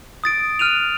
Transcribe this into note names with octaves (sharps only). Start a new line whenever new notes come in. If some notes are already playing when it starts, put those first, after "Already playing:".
D#6 A6 D7
F6 F#6 D#7 F7